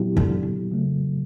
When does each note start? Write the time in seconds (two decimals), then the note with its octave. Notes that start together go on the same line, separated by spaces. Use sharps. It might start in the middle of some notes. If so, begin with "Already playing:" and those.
Already playing: A#2 F#3 B3 E4 G4
0.17 D3
0.71 C#3 F#3 A3